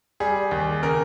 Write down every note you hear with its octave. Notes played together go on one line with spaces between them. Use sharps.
G3 G#4
D#2
C#3 A#4